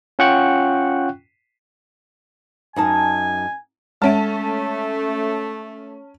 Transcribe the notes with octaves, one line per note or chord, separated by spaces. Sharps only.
C#4 F4 F#5 G5 C#6 F#6
F#2 D#4 G#5 A5
G#3 A3 C#4 C#5 E5 A5